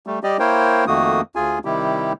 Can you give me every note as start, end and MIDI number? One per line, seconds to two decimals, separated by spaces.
0.07 0.19 55
0.07 0.19 57
0.23 0.37 55
0.23 0.37 67
0.23 0.37 74
0.23 0.37 75
0.39 0.85 58
0.39 0.85 64
0.39 0.85 70
0.39 0.85 72
0.39 0.85 73
0.39 0.85 79
0.87 1.21 41
0.87 1.21 51
0.87 1.21 57
0.87 1.21 58
0.87 1.21 66
0.87 1.21 87
1.36 1.59 38
1.36 1.59 65
1.36 1.59 68
1.36 1.59 80
1.65 2.13 48
1.65 2.13 51
1.65 2.13 55
1.65 2.13 64
1.65 2.13 67